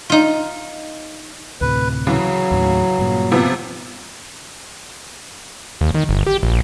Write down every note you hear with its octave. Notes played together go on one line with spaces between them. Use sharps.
D#4 F4
D2 A2 C3 B4
C#3 E3 F#3
D#2 A2
G2 A#2
C3 F3 B3
D#2
D#3
G1
G4
A#1